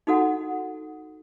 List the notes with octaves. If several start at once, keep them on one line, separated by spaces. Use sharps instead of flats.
D#4 F#4 A4 F#5